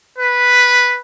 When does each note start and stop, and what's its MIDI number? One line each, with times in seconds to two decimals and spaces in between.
0.18 0.98 71